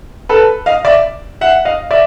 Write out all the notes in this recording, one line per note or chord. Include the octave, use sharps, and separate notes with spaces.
A4 B4
D#5 F5
D5 E5
E5 F#5
D#5 F5
D5 E5